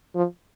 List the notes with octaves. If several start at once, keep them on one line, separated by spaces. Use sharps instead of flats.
F3